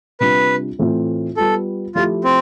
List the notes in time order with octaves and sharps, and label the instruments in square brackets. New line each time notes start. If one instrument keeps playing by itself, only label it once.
[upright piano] C3 G3 D4 F4 [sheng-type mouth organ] B4
[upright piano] A2 E3 A3 C4 F4
[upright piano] G3 B3 F4 [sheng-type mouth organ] A4
[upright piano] F3 A3 E4 G4 [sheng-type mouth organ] F4
[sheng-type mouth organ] C4